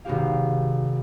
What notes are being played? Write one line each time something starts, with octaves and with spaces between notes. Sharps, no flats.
G#1 C3 B3 F#4 G4 F5